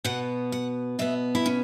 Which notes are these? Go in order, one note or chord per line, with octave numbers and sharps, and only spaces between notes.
B2 B3 F#5
F#5
B2 B3 E5
E4
C#4